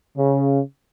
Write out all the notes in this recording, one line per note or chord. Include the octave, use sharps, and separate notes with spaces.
C#3